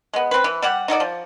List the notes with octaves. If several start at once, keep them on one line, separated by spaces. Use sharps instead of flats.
G#3 B3
C4 B4
E3
G3 G4 F#5
D#4 F#4 A4 D5
F3